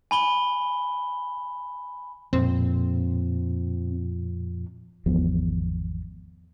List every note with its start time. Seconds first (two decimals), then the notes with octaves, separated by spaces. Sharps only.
0.11 G#5 B5 G7
2.33 F2 A#2 C4
5.06 G#1 E2 F3 B3